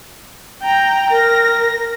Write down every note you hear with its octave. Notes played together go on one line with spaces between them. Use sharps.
G5 A#5
A#4 A#6